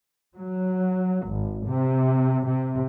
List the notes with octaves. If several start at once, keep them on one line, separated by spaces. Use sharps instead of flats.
F#3
G#1
C3
C3